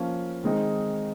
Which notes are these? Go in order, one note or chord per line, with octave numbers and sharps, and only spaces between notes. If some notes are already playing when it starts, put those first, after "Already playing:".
Already playing: F3 A#3 C#4
D#3 G#3 C4 D#4